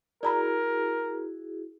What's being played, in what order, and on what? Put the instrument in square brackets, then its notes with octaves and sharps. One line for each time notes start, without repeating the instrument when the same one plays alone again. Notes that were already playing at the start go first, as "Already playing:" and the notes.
[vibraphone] E4 F#4 G#4 [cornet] A#4 [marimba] D5 A#5 B5